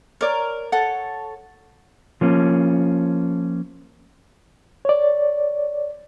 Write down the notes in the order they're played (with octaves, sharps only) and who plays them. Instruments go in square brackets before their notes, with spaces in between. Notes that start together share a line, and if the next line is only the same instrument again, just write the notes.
[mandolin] A#4 [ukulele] C#5 D5
[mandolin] A4 C#5 [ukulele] F#5
[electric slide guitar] F3 A#3 C#4
[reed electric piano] C#5 D5